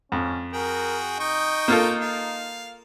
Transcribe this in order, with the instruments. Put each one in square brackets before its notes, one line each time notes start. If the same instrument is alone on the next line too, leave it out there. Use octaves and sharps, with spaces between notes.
[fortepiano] F2 [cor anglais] C#4
[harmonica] F#4 G#4 G5 [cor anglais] A#4
[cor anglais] D#4 [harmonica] D#5 G5 C#6
[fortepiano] A#3 F4 A4
[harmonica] F5